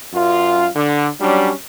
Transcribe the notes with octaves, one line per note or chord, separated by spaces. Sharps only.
F#2 F4
D3
F#3 G3 C#4 D4